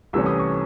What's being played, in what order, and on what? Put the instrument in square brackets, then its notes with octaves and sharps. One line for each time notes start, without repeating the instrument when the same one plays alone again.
[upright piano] C2 C3 E3 A3 C#4 E6
D#6
C#6